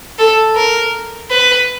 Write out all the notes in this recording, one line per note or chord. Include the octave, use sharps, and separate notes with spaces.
A4
A#4
B4